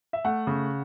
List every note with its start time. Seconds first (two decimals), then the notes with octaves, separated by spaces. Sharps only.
0.13 E5
0.24 A3 F#5
0.47 C#3